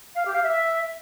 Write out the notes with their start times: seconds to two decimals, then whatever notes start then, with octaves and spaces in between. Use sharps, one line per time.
0.15 F5
0.25 G4
0.34 F5
0.43 E5